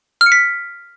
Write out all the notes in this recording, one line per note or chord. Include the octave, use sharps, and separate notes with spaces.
F6
C#7
B6